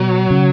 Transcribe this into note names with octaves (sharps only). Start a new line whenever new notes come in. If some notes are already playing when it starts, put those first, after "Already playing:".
Already playing: B2 F#3
C#3